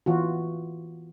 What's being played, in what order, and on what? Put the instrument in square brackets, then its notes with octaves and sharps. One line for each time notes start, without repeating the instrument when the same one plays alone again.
[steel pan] E3 F4 F#4